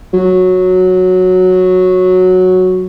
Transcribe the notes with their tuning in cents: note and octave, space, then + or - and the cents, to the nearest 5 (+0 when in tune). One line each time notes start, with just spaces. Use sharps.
F#3 -5